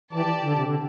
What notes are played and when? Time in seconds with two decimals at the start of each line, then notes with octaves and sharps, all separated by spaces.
0.13 E3 G4 D5 A5
0.42 D3
0.53 C3
0.64 D3